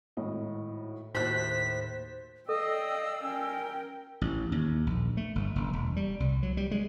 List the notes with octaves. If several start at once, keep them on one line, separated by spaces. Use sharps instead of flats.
G#1 A2 D#5
D#2 A2 F#4 C5 F#6 A6 B6
A4 D5 D#5 F5 G5 E6
C#4 A#4 G5
A1
D#2
A#1
A3
G1
F#1
E1
G3
C2
F#3
G3
G#3